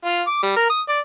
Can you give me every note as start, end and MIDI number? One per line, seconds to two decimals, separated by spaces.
0.05 0.22 65
0.27 0.40 86
0.43 0.53 55
0.56 0.69 70
0.70 0.81 87
0.89 0.99 74